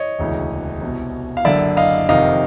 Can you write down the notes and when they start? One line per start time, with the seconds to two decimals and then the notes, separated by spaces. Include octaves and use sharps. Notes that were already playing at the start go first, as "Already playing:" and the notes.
Already playing: C#5 D#5
0.19 E1 D2 C#3 E3
0.82 C2 B2
1.37 F5
1.45 F#1 F#2 D3 D5 E5
1.77 D#5 F5
2.09 F1 F2 C3 D#3 D#5 F5